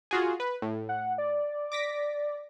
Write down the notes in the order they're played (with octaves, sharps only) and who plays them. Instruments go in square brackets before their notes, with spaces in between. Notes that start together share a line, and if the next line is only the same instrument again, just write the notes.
[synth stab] F4 F#4 G#4
B4
A2
[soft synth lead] F#5
D5
[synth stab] D6 A#6 B6